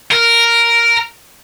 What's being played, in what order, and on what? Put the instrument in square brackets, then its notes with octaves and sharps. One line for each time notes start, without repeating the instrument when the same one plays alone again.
[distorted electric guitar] A#4